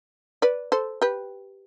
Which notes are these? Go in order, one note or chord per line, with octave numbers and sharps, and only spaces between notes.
B4 D5
A4 C5
G4 B4